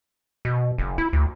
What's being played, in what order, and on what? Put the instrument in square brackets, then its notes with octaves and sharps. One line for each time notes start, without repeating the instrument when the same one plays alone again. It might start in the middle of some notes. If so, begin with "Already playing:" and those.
[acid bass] B2
F#1
E4
D2